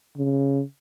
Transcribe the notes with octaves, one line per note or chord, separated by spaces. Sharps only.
C#3